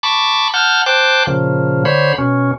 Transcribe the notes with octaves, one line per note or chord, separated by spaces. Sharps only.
A5 B5 C#6 D6
F#5 A5 F6 G6
C5 G5 A5 D6 F#6
A#2 C#3 F3
D3 C5 C#5 B5
B2 C#4